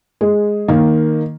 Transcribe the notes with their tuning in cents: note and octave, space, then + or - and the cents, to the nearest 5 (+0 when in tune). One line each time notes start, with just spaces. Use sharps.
G#3 +0 G#4 -5
D#3 +0 A#3 +0